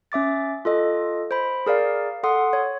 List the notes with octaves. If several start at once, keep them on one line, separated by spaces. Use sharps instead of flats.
C#4 E5 D6 A6
F4 A4 D#5
C5 B5
G#4 A#4 D5 F5
A4 F#5 C6 D#6
C#5